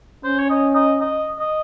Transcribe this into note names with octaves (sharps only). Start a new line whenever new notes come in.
C#4 C5
C#5
D#5
D#5
D#5
D#5